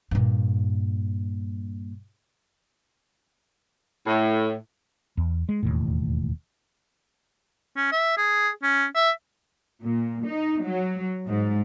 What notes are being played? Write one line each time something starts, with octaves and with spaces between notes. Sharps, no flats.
G2 A#2
A2
E2
G#3
E1 D#2 A2
C#4
E5
G#4
C#4
E5
A#2
D#4
F#3
G#2